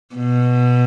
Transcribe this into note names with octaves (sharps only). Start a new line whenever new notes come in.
B2